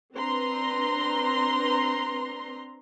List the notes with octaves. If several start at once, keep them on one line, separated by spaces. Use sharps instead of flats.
C4 D4 B4 A#5 C6